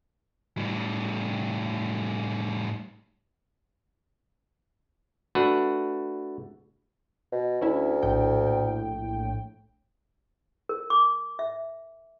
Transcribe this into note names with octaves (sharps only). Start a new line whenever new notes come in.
A2 G3
A3 D4 F#4 B4
B2
D2 C#4 E4
A#1 A2 G5
A#4
D6
E5